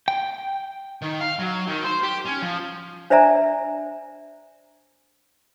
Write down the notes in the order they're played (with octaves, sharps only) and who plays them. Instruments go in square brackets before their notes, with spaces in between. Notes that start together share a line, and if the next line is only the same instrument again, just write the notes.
[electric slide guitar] G5
[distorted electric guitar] D#3
F5
F#3
D#3
C5
G4
C#4
F3
[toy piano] D4 C5 D5 E5 G#5 A#5